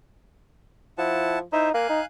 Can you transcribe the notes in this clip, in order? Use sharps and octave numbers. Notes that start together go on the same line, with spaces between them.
F3 E4 F#5 A5
D#4 E4 C5 E5
A#3 F5 G#5 F#6
D#4